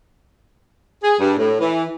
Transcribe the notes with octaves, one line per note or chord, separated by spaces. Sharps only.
G#4
G2
A2
E3